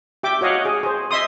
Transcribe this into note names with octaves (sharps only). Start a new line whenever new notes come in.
G4 E5 G5 D6
F#4 C#5 D#5 F5 F#5
G#4
G#4 C5
D#5 E5 C6 D#6